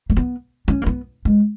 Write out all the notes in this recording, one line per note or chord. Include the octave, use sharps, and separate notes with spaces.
A#3
B3
C#4
A#3
B3
G#3